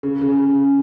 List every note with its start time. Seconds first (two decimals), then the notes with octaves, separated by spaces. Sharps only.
0.03 C#3
0.21 C#3